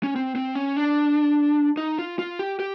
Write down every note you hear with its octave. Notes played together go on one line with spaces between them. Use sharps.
C#4
C4
C4
C#4
D4
D#4
F4
F4
G4
G4